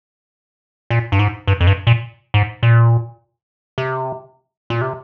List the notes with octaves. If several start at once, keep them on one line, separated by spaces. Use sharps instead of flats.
A#2
G2
G#2
G2
F2
G2
A#2
G#2
A#2
C3
A#2
C3